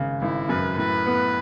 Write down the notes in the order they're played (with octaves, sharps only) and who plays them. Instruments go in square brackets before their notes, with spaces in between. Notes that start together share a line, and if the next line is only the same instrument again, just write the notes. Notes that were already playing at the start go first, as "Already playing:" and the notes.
Already playing: [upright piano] G#1 C#3
[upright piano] G#1 [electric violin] E4
[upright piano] F#2 [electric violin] B4
[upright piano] A2 [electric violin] B4
[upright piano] B3